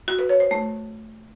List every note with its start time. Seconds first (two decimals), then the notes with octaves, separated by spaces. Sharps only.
0.08 F#4
0.19 B4
0.29 C#5
0.40 C5
0.51 A3